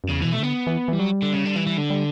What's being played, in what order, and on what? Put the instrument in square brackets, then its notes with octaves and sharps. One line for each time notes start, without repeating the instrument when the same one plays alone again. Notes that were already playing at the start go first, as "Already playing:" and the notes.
[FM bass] F#2
[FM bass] E2 [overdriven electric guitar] C#3
[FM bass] B2 [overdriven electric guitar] E3
[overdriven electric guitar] A3
[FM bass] D3 [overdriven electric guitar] B3
[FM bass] E3
[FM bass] E3 [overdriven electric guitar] G3
[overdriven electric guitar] F#3 [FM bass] G3
[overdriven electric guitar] D3
C#3
D3
E3
E3
D3
[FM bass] G3